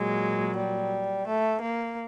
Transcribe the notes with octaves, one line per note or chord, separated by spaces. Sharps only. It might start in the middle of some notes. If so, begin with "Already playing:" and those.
Already playing: A#2 F#3 G#3
G3
A3
A#3